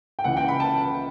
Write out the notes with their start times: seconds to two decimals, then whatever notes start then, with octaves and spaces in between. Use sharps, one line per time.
0.19 G5
0.24 C#2 C#3 E3 F#5
0.37 G5
0.48 B5
0.60 A5